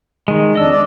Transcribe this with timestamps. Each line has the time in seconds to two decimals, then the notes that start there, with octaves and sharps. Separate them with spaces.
0.28 D#3 G#3
0.55 F2 D4 D#5 E6
0.70 D5